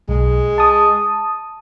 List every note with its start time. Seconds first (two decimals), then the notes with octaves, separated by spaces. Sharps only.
0.09 B1 G#3
0.58 A5 D#6